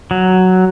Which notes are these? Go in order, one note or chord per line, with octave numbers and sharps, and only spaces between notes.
F#3